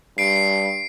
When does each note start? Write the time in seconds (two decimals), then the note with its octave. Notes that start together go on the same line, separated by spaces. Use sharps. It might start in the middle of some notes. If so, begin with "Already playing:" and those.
0.18 G2 C7 D7